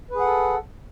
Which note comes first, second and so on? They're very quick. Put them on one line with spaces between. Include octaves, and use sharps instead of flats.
B4 G#4 F#5 A4